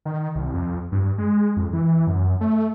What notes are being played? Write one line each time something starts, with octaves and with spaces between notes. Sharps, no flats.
D#3
C2
F2
G2
G#3
F2
E3
F#2
A3